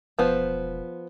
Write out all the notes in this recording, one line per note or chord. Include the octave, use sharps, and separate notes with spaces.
E1 F3 B3 C5